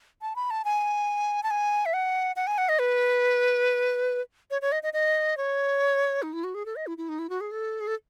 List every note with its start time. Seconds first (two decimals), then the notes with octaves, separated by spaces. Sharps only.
0.22 A5
0.36 B5
0.51 A5
0.65 G#5
1.43 A5
1.51 G#5
1.86 E5
1.93 F#5
2.36 F#5
2.47 G#5
2.58 F#5
2.69 D#5
2.79 B4
4.51 C#5
4.62 C#5
4.72 D#5
4.83 D#5
4.93 D#5
5.37 C#5
6.23 D#4
6.33 E4
6.44 F#4
6.55 G#4
6.66 A4
6.76 D#5
6.87 E4
6.98 E4
7.09 D#4
7.19 E4
7.30 F#4
7.41 G#4
7.51 A4
7.81 G#4
7.87 A4